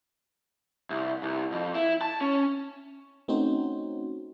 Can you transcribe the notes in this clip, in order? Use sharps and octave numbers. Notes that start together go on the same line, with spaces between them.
C2
C2
F2
E4
A5
C#4
A3 C4 C#4 D#4 F#4 C5